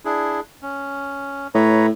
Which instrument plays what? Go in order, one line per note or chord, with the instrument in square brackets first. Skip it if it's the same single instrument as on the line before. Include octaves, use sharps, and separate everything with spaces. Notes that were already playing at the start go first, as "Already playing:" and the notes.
[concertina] D4 E4 G#4
C#4
[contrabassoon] A2 [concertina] B4 C#5 A#5